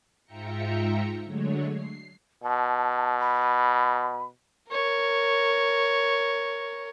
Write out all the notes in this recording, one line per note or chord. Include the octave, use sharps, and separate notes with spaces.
G#2 F4 E5 G5 A#5 C#7
D3 F#3 G#3 A3 C#5
C7
B2 A5
B5
A#4 C#5